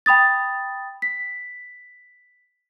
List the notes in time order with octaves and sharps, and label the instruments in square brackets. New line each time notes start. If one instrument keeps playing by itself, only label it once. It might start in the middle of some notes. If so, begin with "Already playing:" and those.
[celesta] G5 B5 D#6 A6
B6